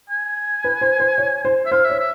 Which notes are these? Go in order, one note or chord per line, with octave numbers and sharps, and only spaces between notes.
G#5
B4
C5
C5
C#5
C5
E5
C5 F5
E5
C#5
E5